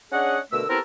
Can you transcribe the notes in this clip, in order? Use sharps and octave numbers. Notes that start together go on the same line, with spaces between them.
C#4 D4 G#4 C#5 D#5 F#5
B2 D3 A3 A#4 E6
B3 C4 E4 G4 A4 A#4